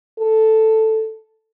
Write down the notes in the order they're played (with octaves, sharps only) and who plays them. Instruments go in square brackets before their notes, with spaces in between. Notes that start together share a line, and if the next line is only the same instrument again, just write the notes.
[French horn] A4